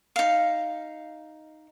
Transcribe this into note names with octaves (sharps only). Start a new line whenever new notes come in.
D#4 F5